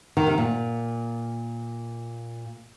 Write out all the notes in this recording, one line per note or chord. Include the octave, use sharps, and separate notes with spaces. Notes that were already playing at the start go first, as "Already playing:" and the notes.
D#3
C3
A#2